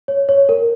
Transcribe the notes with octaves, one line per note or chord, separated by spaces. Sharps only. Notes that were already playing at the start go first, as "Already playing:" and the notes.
C#5
C#5
A#4